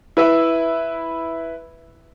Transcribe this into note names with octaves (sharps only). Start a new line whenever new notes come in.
E4 B4 E5